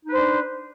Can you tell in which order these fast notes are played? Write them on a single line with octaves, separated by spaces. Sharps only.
D#4 B4 C5 D4